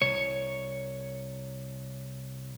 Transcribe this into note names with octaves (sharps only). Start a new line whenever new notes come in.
C2 C#5